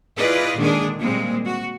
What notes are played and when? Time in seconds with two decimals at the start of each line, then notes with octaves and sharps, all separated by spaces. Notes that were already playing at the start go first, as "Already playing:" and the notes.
0.17 E4 F4 G#4 B4 D5 D#5
0.57 A#2 D3 D#3 G#3 D4 G#4
1.00 A#2 G3 G#3 A#3 C4
1.46 F#4